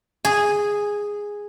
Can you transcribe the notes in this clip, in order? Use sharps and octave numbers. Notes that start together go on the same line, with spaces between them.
G#4